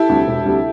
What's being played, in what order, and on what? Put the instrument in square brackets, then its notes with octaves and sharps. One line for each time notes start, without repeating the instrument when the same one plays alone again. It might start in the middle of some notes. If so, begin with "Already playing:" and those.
Already playing: [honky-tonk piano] E4 G4 A4
[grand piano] D2 C3 G3
E1
D2 C3 G3